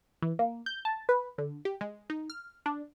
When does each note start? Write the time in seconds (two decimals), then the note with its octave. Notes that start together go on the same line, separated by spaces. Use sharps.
0.22 E3
0.39 A#3
0.66 G6
0.85 A5
1.09 B4
1.38 D3
1.65 G4
1.81 G#3
2.10 D#4
2.30 F6
2.66 D4